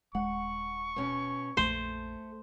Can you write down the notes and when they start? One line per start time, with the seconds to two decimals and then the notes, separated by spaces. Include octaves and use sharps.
0.15 D#1 G#3 F#5 C#6
0.96 B2 C#4
1.57 A#1 F2 A#2 A3 C5